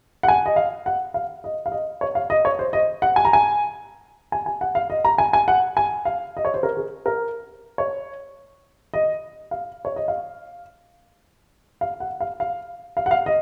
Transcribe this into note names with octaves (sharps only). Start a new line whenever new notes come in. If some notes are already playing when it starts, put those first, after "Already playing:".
F#5
G#5
D#5
F5
F#5
F5
D#5
F5
D#5
C#5
F5
D#5
C#5
C5
D#5
F#5
G#5
A#5
G#5
G#5
G#5
F#5
F5
D#5
A#5
G#5
G#5
F#5
G#5
F5
D#5
C#5
C5
A#4
G#4
A#4
C#5
D#5
F5
C#5
D#5
F5
F5
F#5
F5
F5
F5
F#5
F5
D#5